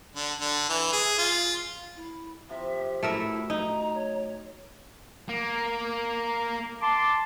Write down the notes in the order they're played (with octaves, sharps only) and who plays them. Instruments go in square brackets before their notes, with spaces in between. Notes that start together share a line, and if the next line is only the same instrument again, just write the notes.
[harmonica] D3
D3
E3
G#4
F4
[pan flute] E4
[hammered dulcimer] C3 F3 [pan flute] E5
[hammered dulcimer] F#2 [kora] A3 A#4 E5 [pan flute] E4
[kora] D#4 [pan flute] A#5
[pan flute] C#5
[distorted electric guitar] A#3
[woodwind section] A5 C6 D6